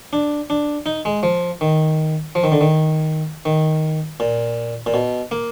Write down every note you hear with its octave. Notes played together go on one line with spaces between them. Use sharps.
D4
D4
D#4
G#3
F3
D#3
F3
D#3
D3
D#3
D#3
A#2
A#2
B2
A#3